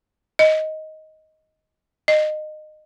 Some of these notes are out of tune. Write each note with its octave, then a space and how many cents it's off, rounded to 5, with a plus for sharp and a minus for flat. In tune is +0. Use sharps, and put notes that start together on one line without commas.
D#5 +10
D#5 -20